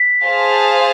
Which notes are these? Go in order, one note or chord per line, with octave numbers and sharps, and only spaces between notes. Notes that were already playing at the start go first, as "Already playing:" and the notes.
Already playing: B6
G#4 C5 F5 A5